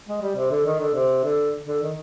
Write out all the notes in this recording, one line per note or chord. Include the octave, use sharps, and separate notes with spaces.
G#3
G3
C3
D3
D#3
D3
C3
D3
D3
D#3